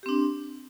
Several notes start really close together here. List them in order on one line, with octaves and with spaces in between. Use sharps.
G4 C4 D4